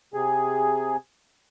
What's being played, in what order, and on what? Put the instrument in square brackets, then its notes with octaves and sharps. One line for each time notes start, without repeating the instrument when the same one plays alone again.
[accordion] C3 G#4